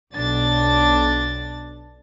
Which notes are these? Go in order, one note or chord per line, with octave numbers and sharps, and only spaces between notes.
B1 D4 A6